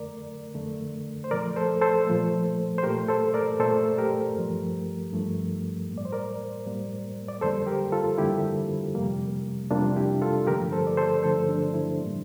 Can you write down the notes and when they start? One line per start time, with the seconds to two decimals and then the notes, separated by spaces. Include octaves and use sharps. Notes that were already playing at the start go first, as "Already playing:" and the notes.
Already playing: F2 D3 A3 A#4 D5
0.54 F2 D3 A3
1.24 C5
1.31 A#2 F3 A3 A#4 D5
1.56 A4 C5
1.81 A4 C5
2.07 A#2 F3 A3
2.78 C5
2.83 A3 G4 A#4
2.87 A#2
3.09 A4 C5
3.34 A#4 D5
3.60 A#2 A3 A4 C5
3.98 G4 A#4
4.37 G2 F3 A3
5.13 G2 F3 A3
5.89 A2 G3 A#3
5.98 D5
6.05 C5
6.13 A#4 D5
6.66 A2 G3 A#3
7.28 D5
7.41 F2 D3 G3 A#3 A4 C5
7.67 G4 A#4
7.92 F4 A4
8.18 F2 D3 G3 A#3 E4 G4
8.95 F2 C3 G3 A#3
9.70 F2 C3 G3 A#3 D4 F4
9.96 E4 G4
10.22 F4 A4
10.47 G2 D3 F3 A3 G4 A#4
10.72 A4 C5
10.87 D5
10.97 A4 C5
11.23 G2 D3 F3 A3 A4 C5
11.49 D4
11.74 E4
12.00 A2 E3 G3 A#3